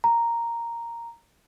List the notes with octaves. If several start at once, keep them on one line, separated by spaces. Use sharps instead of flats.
A#5